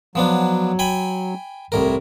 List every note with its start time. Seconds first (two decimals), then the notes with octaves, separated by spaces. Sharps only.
0.15 F3 F#3 B3 D4
0.79 G5 G#5 B5
1.72 C2 A2 A#4